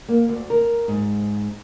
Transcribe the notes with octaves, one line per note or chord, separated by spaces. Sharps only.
A#3
D2
A#4
G#2